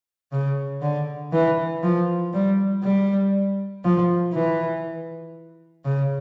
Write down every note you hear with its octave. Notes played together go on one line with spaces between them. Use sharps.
C#3
D3
E3
F3
G3
G3
F3
E3
C#3